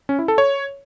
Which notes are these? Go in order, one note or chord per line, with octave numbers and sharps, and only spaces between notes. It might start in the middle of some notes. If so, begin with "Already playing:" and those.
C#4
E4
A4
C#5